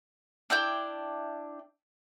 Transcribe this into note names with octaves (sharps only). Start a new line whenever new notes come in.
D4 E4 G5 G6